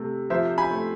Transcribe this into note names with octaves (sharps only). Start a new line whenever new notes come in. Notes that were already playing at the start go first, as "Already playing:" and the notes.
Already playing: C3 A3
F3 C5 E5
G#5 B5
A3